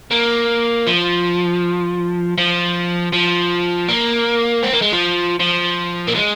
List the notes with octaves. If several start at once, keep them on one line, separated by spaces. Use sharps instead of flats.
A#3
F3
F3
F3
A#3
C4
A#3
G#3
F3
F3
A#3
G#3